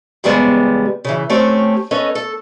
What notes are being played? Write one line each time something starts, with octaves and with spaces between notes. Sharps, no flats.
E2 G#2 C#3 G3 G#3 B3
C#3 E3
A3 C4 C#4 G4 C#5
C#4 A4 B4 D#5
A4